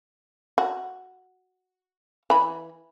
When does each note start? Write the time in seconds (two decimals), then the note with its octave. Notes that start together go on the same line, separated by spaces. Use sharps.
0.58 F#4
2.30 E3 B5